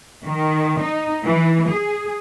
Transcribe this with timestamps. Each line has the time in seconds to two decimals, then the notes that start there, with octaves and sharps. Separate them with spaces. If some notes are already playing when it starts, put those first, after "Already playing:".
0.23 D#3
0.80 D#4
1.24 E3
1.70 G#4